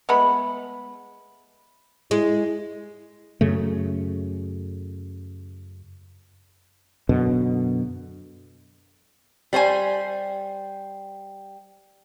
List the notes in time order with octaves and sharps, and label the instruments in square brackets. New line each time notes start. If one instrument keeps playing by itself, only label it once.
[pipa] G#3 A3 B3 B5
[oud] G#3 [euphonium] E4
[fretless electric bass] F#2 C#3 A3
F#2 B2 D3
[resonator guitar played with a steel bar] G3 C5 C#5 G#5